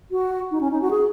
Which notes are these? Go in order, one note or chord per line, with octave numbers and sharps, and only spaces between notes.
F#4
D#4
C#4
D#4
F#4
G#4